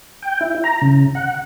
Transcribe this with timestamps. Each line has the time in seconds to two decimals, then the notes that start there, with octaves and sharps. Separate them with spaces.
0.22 G5
0.41 E4
0.64 A#5
0.82 C#3
1.15 F#5